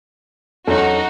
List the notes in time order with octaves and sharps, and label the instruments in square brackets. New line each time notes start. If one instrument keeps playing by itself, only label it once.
[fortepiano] E2 F#3 C#4 [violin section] D#4 F#4 F#5 [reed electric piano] A4